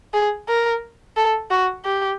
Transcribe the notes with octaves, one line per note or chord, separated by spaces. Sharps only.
G#4
A#4
A4
F#4
G4